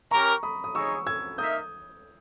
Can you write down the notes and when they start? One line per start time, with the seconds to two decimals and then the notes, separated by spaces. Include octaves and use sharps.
0.11 C#4 G4 A#4 A#5 C#6
0.43 B5 D#6
0.64 D#6
0.74 D#4 G#4 C#5 C#6 E6
1.06 E6 G#6
1.38 A#3 D#4 A#4 E5 D#6 G6